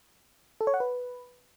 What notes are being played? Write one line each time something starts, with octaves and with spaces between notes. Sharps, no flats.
A4
C#5
F#5
B4